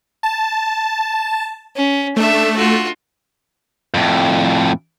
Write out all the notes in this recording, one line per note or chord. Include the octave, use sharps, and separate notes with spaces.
A5
C#4
A3 D4 E5
F4 F#4
F2 A2